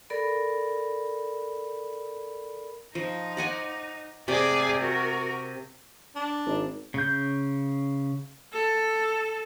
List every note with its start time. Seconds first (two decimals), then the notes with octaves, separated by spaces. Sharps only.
0.10 A4 A#4 D5 B5
2.95 F3 D#4
3.37 D5 F#5 G#5
4.28 C3 G#4 D5
4.81 F#4 A#4
6.16 D4
6.46 G#1
6.94 C#3 G6
8.53 A4